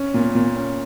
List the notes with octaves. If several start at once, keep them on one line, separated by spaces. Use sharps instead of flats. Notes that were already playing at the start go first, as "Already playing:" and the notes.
Already playing: C#4
A#2
A#2
C#4